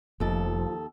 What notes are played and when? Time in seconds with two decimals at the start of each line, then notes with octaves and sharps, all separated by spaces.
0.20 F1 D#2 F3 A4